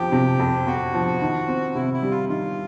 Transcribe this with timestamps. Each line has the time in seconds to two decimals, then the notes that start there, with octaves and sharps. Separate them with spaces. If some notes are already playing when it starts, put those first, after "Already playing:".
Already playing: F2 F3 G4
0.12 C3
0.39 F2
0.67 F2 F#4
0.94 F3
1.21 D#3
1.48 C4
1.75 C3 E4
1.94 E4
2.02 G3
2.11 F4
2.29 D#3 F4